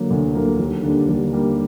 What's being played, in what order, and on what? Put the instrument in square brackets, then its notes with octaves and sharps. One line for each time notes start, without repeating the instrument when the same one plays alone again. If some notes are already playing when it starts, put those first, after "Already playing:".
Already playing: [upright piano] D3 F#3 A#3
D2
D3 F#3 A#3
D#2
D3 G3 A#3 D4
D#2
D3 G3 A#3 D4